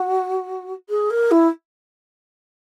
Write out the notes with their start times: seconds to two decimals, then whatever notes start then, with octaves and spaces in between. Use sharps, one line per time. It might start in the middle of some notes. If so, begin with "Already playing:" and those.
Already playing: F#4
0.89 G#4
1.10 A#4
1.31 E4